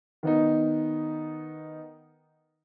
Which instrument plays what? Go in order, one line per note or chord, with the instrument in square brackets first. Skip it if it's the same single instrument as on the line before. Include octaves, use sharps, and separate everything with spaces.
[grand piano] D#3 B3 D#4